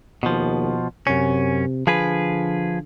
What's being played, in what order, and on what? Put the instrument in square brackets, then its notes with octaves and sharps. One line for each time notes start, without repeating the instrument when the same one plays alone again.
[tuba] D#2 [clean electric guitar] B2 F3
[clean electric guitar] F#2 C#4 [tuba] C3
[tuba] D3 [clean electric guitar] F3 G#4 B4